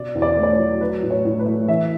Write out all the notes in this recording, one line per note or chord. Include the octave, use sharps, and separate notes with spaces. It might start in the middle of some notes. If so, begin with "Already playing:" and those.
Already playing: B2 D5
E2
D5
A3
D5
C#5
F#3
F#3 B4
A2
C#5
A2
B4
A3
E3 E5